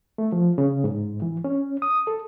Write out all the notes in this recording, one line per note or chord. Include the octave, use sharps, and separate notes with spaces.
A3
F3
C#3
G#2
E3
C#4
D#6
A4